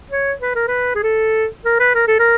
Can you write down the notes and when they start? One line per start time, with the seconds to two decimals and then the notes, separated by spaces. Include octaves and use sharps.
0.11 C#5
0.41 B4
0.55 A#4
0.68 B4
0.95 G#4
1.03 A4
1.65 A#4
1.80 B4
1.95 A#4
2.07 A4
2.19 A#4